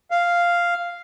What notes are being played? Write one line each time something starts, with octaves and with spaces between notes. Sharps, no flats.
F5